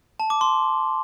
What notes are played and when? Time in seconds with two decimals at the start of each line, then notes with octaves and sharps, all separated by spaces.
0.20 A5
0.30 D6
0.41 C6